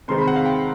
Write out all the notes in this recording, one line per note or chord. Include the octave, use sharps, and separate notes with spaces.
C3 D#3 G#3 C4 D#4 C6
B5
F#5
F5
G5